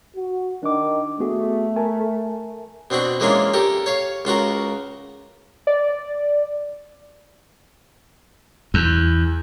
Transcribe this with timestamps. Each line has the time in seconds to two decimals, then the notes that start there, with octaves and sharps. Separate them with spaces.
0.16 F#4
0.63 D#3 D4 D6
1.20 A3 B3 F#4 G#4
1.76 A#4 G#5 A5
2.90 B2 C4 D4 F#4
3.20 E3 G#3 A#3 C#4 D4 F4
3.54 G4 A4 A#4
3.86 C#5 F5
4.25 C#2 F4 F#4 A#4
5.67 D5
8.74 E2